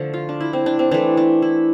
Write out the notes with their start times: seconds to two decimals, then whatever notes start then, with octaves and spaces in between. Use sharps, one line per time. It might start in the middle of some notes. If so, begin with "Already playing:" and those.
Already playing: D3 F3 A3
0.14 F4
0.29 D4
0.40 E4
0.53 C4
0.66 D4
0.79 C4
0.91 E3 A3 D4
1.17 D4
1.42 E4